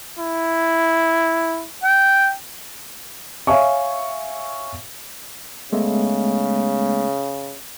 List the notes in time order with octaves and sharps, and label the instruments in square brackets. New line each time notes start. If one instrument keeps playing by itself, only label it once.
[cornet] E4
G5
[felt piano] C#5 E5 F5 G#5 C#6
[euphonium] C#3 [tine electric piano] G#3 A3 B3